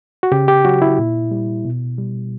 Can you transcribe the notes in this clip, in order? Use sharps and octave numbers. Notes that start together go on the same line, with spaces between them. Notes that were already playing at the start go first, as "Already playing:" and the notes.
F#4
C#3 G4
G4
F#3 F#4
E4
A#2
G3
B2
G3